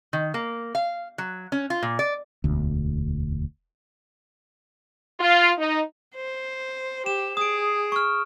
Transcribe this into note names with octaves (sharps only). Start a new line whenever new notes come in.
D#3
A#3
F5
F#3
C#4
F4
A#2
D5
E1 D2
F4
D#4
C5
G4 E7
G#4 D#6 D7
C#6 F6